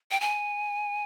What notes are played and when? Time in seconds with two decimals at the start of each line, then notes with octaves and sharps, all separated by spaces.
0.11 G5
0.21 G#5